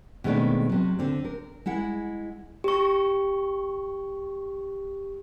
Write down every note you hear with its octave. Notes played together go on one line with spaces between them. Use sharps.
B2 D#3 G#3 A3 C4 D4
C3 F#3
D3 C4
A#4
G#3 E4 F#5
G4 C#6